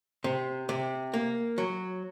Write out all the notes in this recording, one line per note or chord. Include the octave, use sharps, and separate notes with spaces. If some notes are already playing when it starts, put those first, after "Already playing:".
C3
C3
A#3
F#3